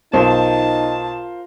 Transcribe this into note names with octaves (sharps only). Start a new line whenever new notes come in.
B1 D#4 F4 A#4 C5 A5